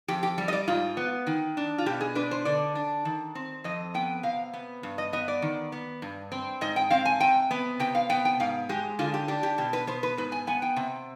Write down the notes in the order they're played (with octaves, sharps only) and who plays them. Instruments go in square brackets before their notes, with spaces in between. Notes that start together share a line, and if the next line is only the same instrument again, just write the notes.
[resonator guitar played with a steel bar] F2 G4
G4
G3
D#5
D5
G#2 F4
B3
D#3
D4
F4
B2 G4
G#4
D4 B4
C5
D3 D5
D4
D#3
C4
F2 D#5
B3 G5
C3 F5
B3
G2
D#5
B3 D#5
D5
D#3
B3
G2
C4
G#2 D#5
G5
C4 F5
G#5
C3 G5
B3
C3 G5
F5
B3 G5
G5
G#2 F5
G#3 G4
D3 F4
G4
D4 G4
G4
B2 G4
B4
B3 C5
B4
G#2 B4
G#5
B3 G#5
G5
C3